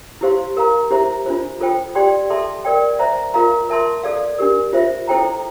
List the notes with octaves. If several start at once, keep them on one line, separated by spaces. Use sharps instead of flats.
E4 G4 C5 F5 C6
A#4 F5 A#5
E4 G4 C5 E5 A#5
D4 F4 C5
F4 A4 C5 G5
G4 D5 G5 C6
A4 E5 A5 C6
A#4 D5 G5
C5 E5 A#5
F4 A#4 F5 A#5
A#4 E5 A5 C6
A4 D5 F5
D4 G4 A#4
F4 C5 E5
E4 A4 C5 G5 A#5